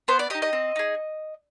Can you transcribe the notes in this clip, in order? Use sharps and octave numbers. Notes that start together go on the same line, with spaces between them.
B3 C5
D5
D#4 G4 D#5
D#5
C4
D#4 G#4